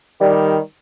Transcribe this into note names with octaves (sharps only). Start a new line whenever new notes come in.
D#3 G3